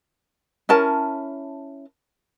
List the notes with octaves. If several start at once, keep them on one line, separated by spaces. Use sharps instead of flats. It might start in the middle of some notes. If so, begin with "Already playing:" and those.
C#4 E4 A#4 A5